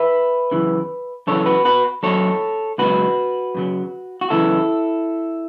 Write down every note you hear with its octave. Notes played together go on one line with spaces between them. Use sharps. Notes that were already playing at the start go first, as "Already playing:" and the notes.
Already playing: B4 E5
F#2 C#3 E3
F#2 C#3 E3 A4 C#5
F#4 B4
F#4 B4
F#2 F#3 A4 C#5
C#2 C#3 F#3 F#4 B4
F#2 C#3 F#3
F#4
F#2 C#3 E3 E4 A4